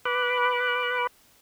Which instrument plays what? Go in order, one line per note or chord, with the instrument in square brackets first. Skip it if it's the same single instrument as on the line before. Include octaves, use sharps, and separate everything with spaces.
[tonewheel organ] B4 B5 D6 F#6